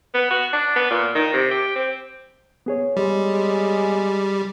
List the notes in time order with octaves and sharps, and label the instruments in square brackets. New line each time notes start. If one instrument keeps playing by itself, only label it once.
[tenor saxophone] B3
F#4
D4
B3
A#2
D#3
C3
G4
C4
[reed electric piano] B3 G#4 C#5
[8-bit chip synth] G3 [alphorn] G#3